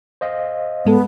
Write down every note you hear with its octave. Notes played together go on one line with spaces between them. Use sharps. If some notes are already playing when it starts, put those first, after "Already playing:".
C5 D#5 F5
G#2 G#3 B3 A4